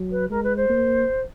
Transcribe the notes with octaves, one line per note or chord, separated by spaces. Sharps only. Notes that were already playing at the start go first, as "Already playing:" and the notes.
Already playing: F#3
B4
G#3 A#4
B4
C5
A#3